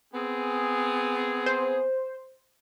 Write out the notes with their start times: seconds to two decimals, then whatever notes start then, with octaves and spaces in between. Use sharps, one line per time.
0.13 B3 C4 G#4
1.46 C5